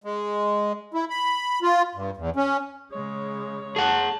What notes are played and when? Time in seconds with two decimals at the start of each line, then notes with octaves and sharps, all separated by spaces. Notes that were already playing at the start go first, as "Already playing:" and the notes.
0.04 G#3
0.94 E4
1.10 B5
1.62 F4
1.95 G2
2.17 E2
2.36 C#4
2.92 C#3 G#3 C#5
3.76 G#4 F#5 A5